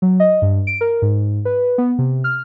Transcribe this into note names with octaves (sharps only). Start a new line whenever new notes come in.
F#3
D#5
G2
D7
A#4
G#2
B4
B3
C3
F6